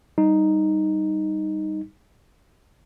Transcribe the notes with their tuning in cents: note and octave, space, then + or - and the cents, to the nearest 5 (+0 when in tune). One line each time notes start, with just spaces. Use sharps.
G3 +0 D#4 +0